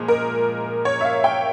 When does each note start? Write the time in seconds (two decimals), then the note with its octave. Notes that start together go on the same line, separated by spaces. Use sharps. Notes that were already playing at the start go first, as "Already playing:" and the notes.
Already playing: A#2 F3 G#3
0.08 A#4
0.85 C#5
1.01 E5
1.05 F5
1.24 G5